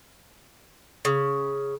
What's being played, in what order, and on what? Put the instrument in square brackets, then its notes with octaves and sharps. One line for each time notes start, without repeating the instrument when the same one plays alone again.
[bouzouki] C#3